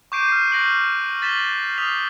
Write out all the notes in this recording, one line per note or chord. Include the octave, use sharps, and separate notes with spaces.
C#6 D6 G6 C7 D7 D#7
F6 C7
F#6 G6 A#6 D7 F#7
A6 B6 E7 F#7 G7
D#6 F6 B6 C7 F7